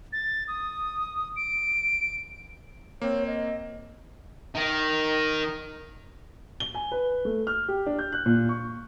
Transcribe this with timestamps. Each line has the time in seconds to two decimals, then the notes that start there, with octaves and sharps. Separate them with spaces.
0.13 A6
0.48 D#6
1.36 D7
3.01 A#3 C4 C#5
3.27 D#5
4.55 D#3
6.60 G7
6.75 G#5
6.92 B4
7.25 A3
7.47 F6
7.68 G4
7.86 D4
7.99 G6
8.12 F#6
8.26 A#2
8.49 C#6